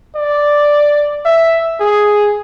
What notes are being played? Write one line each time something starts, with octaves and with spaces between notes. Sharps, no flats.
D5
E5
G#4